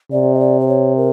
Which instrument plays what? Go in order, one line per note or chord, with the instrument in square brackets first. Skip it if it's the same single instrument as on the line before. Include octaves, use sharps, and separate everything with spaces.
[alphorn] C3 [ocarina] D5
[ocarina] D#5
D5
C5
C#5
A#4